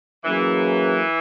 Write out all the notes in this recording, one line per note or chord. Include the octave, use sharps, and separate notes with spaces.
E3 F#3 A#3 C#4 G#4 B4